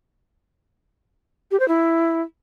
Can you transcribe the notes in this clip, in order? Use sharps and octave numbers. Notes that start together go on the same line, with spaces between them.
G4
C5
E4